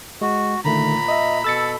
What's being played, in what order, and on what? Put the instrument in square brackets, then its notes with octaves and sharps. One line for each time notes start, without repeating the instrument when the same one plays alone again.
[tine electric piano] G#3 [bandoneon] F#4
[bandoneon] A#2 A#5 [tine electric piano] D3 D#3 A3 [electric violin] B5
[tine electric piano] D#5 E5
[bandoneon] B2 A4 [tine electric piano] E6 A6 C#7